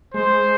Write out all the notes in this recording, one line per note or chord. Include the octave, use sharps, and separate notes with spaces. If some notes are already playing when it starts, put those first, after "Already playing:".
G#3 C5